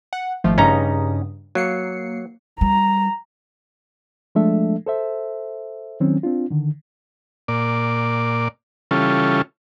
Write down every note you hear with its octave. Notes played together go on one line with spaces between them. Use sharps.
F#5
G#1 F3 A3
G2 C#3 C#4 D#4 A#5 D#6
F#3 A#3 C7 C#7
G3 A#5
F3 G#3 A3 D4 A4 E5
A4 C5 E5
D#3 F#3 C4 C#4
C4 D4 F4
D3 D#3
A#2 D5
C#3 E3 G3 C#4 F4 A4